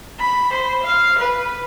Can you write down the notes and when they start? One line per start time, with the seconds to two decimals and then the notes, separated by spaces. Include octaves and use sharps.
0.19 B5
0.53 C5
0.83 F5
1.19 B4